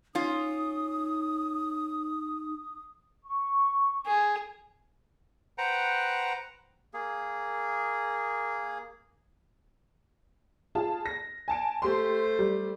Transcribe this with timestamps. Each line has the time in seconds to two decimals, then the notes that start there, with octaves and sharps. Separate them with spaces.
0.15 C#4 D#4 F4 D#6
3.24 C#6
4.06 G#4
5.58 B4 C5 F#5 G5 A#5
6.94 A#3 G#4
10.75 F4 G#4 A5
11.06 A#6
11.48 G#5 A5 D7
11.82 A3 G4 C5 C6
12.39 G3